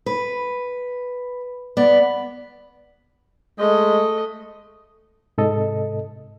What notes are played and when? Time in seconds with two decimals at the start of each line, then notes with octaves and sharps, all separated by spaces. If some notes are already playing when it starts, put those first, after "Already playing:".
0.06 B4
1.77 B3 D5
3.59 G#3 A3 D#5
5.38 G#2 C3 A4 D#5